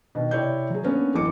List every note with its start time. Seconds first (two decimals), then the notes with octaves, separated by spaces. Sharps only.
0.15 B2 D#3
0.31 C3 E4 C#5 D5 G6
0.70 F#3 G#4
0.84 A#3 B3 C#4 D4 A#4
1.14 A1 F#2 E3 D6 C#7